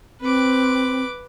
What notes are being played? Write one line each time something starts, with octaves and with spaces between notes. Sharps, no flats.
C4 B4 D6